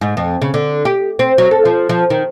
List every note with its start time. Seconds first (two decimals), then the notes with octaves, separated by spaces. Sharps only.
0.01 G#2
0.17 F2
0.42 C#3
0.54 D3
0.85 G4
1.19 C4
1.38 F#3
1.51 A4
1.65 F3
1.89 F3
2.10 D#3